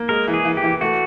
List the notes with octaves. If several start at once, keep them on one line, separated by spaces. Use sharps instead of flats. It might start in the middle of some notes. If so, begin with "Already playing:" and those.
Already playing: A#3
G#3 A#4
E3
G#4
E3
G4
E3
A3 F#4